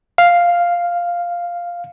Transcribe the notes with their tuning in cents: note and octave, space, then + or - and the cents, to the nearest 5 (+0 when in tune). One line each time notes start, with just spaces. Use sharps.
F5 +0